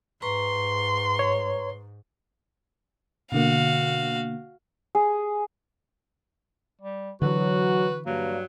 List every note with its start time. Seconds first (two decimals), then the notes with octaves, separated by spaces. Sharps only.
0.22 G#2 B4 A#5 C6 C#6
1.19 C#5
3.32 B2 D3 A#3 F#4 F5
4.95 G#4
6.82 G3
7.22 D3 E3 F#3 F#4 B4
8.06 G2 F#3 A#3